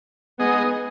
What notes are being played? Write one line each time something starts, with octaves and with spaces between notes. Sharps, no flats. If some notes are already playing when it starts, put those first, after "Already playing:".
G#3 B3 D#4 G#4 D#5